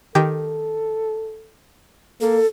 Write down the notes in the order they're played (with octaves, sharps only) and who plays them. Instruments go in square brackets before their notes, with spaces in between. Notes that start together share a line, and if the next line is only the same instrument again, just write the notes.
[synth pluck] D#3 G4 G5 [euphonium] A4
[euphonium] A#3 [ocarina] A4